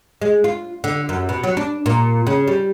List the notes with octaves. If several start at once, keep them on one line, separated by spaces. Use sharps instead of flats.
G#3
F4
D3
F#2
B2
F#3
D4
A#2
C#3
G3